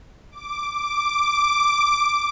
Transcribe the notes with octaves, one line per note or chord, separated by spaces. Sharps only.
D6
D6